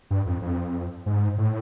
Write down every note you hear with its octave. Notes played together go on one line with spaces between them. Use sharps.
G2
F2
F2
G#2
A2